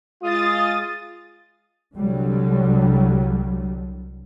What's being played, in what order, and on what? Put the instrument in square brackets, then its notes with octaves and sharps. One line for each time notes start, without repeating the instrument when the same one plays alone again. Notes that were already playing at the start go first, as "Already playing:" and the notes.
[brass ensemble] G#3 F4 [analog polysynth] D#6 A6
[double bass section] C2 D3 F#3 G3